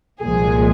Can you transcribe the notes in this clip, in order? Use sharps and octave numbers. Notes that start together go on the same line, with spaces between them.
C2 A#2 F3 G#3 G#4